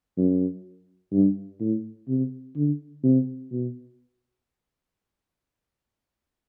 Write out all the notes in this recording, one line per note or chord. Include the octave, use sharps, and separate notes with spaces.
F#2
G2
A2
C3
D3
C3
B2